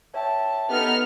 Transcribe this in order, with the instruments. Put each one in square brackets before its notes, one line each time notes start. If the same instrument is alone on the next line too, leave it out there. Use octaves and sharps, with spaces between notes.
[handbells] C#5 E5 G5 [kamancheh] A5
[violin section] B3 D#4 F6 [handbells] G4 A4